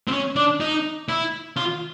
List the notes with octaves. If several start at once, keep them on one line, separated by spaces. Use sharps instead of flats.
C4
C#4
D4
D#4
E4
F4